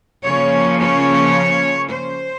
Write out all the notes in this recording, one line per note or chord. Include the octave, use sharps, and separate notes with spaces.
C#3 F3 A#3 C#4 C#5
C#5
C5